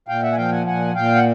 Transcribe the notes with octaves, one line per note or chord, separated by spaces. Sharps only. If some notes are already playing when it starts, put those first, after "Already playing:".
A#2 F5 G5
E5 F#5
G#5
F3 F5 G5
F#5 G#5
A#2 F#5 G#5
A#2 F5 G5
F#5